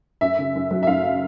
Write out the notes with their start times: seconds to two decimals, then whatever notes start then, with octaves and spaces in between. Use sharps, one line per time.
0.21 F#2 E5
0.39 C#3
0.55 F#2
0.71 F#3
0.83 E5
0.87 F#2 F5